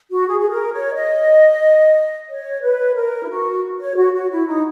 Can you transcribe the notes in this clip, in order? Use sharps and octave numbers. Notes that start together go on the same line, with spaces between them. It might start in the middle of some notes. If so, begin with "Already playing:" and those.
F#4
G#4
G#4
A#4
C#5
D#5
C#5
B4
A#4
E4
F#4
C#5
F#4
F#4
E4
D#4